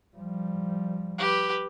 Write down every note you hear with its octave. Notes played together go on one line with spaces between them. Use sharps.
F3 G3
G4 B4